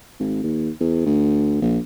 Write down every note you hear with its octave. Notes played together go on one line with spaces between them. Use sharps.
G#1
D#2
E2
D2
A#1